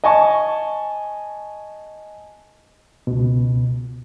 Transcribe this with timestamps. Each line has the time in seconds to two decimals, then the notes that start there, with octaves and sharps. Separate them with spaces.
0.04 D#5 G#5 A5 C#6
3.07 C#2 B2